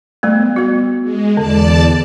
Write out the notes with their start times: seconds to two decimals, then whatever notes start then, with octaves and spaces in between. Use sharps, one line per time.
0.23 G3 A3 B3
0.56 B3 F#4
1.03 G#3
1.37 E2 D3 D5 A5